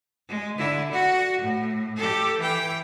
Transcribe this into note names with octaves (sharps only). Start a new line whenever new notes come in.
G#3
D3 E4
F#4 F#5
A2
G4 A4
E3 G5